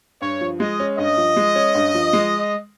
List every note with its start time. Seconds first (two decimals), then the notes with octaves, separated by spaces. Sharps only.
0.22 G2 C#5
0.41 F3
0.60 G#3 D#5
0.80 C#4
0.98 G2 D#5
1.17 F3
1.37 G#3
1.55 C#4
1.75 G2
1.95 F3
2.13 G#3